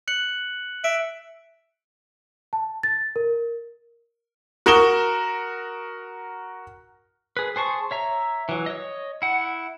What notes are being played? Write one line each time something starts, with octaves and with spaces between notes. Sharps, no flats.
F#6 C#7 F#7
E5 D7
A5
A6
A#4
F#4 A#4 C#6 D#6 E7 G7
G#4 B4
G#4 C5 A5 C#6
C#5 E5 A#5
E3 F#3
C#5 D#5
E4 F#5